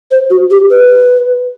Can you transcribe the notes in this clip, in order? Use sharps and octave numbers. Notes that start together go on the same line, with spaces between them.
C5
F#4
G4
B4